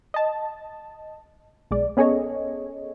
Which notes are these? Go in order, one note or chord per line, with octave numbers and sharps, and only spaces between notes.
D#5 A5
B1 G#3 D5
B3 C#4 G#4 A4 C#5 D#5